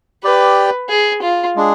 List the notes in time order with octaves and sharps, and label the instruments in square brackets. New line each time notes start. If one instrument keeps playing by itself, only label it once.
[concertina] G4 D5 G5 [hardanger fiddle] B4
[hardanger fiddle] G#4
F4
[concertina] G#3 D4 G#4